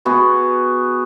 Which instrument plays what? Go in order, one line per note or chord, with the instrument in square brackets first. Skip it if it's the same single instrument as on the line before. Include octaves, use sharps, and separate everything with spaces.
[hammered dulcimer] B3 F#4 G#4